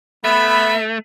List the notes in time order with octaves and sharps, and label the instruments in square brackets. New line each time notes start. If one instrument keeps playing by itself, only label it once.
[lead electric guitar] A3 [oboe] B3 [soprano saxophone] E5 [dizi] B5